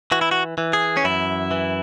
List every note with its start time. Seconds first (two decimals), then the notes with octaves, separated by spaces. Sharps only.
0.12 E3 F#4
0.21 E4
0.31 F#4
0.58 E3
0.73 G#4
0.97 C#4
1.04 F#2 E4
1.51 E3